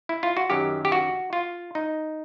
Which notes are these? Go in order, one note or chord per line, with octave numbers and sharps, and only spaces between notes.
E4
F4
F#4
F#2 D#3 F#3 G4
G4
F#4
F4
D#4